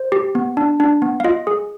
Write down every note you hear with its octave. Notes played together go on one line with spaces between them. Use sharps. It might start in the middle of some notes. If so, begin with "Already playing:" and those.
Already playing: C5
G4
B3
D4
D4
B3
F5
F4 D#5
G#4